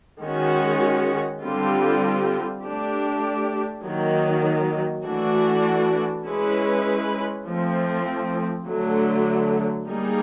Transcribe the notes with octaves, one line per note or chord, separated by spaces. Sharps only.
D#3 G#3 C#4 F#4
D3 G3 C4 F4
A3 D4 G4
D#3 F#3 A#3
E3 A3 D4 F#4
G#3 C#4 E4 G#4 B4
F3 A3 C4
D3 F#3 A3
G3 A#3 D#4 G#4